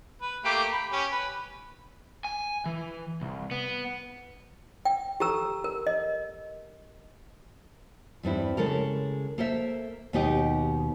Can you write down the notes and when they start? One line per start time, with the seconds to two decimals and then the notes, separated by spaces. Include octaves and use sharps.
0.21 B4
0.45 A3 A#3 G4
0.72 B5
0.92 C#4 G4
1.11 B4
2.25 G#5
2.66 E3
3.22 C2
3.51 B3
4.85 G5
5.20 G4 A4 A#5 E6
5.64 A#4
5.87 D#5
8.23 E2 G2 C4 E4
8.57 C#3 G#3 A4 A#4
9.38 A#3 A4 C5 E5
10.13 D#2 B2 B3 D#4 G4 D#5